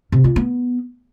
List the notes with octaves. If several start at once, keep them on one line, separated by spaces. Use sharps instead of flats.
C3
F4
B3